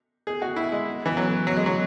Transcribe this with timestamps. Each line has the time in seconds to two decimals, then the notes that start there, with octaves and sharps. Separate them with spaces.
0.27 G#4
0.42 F#4
0.56 E4
0.72 G#3
1.06 E3
1.17 F#3
1.47 F#3
1.57 G#3
1.66 F#3